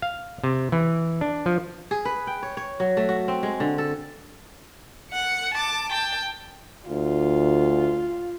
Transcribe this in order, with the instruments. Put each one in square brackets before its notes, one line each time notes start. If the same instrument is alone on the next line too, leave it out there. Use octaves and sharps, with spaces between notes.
[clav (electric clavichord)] F5
C3
E3
D4
F3
[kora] G#4
B4
G5
C#5
C#5
F#3
A3
F#4
C4
G#3
D3
A4
[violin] F#5 C#7
A5 D6
G5 A5
[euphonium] D2 [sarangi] F4